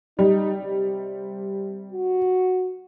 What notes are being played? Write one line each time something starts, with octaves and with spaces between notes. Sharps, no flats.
G3 D#4
C3
F#4